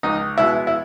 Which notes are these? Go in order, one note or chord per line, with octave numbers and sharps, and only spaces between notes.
C#2 D#4
B2 G#3 B3 E4
E4